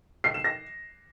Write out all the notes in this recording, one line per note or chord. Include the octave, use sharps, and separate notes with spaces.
C7
E7
A#6